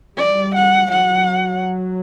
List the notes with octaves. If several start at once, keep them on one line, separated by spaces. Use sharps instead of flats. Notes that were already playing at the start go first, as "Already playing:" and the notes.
G3 D5
F#5
F#3 F#5